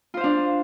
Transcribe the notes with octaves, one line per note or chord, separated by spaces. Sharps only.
D4 F4 C5 F5